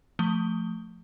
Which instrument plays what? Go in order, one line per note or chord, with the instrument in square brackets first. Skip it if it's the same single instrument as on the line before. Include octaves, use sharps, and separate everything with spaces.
[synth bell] F3 A3 G7